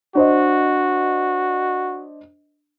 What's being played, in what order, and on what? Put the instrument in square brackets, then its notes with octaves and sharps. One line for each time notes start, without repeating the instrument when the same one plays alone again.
[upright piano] D4 C5 D#5 [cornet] F#4